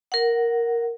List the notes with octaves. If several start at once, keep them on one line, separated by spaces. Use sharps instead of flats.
A#4 F#5